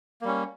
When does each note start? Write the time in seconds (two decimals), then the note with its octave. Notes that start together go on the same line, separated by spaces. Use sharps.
0.21 A#3
0.24 G3
0.28 C#4